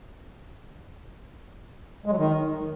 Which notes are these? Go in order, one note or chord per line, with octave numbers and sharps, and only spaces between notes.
G#3
F#3
D#3